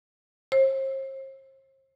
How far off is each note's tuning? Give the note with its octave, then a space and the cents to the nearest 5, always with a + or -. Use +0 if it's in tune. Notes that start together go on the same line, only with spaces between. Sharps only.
C5 +40